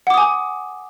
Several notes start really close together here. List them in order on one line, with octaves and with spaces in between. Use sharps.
F#5 D6 D#6 G#5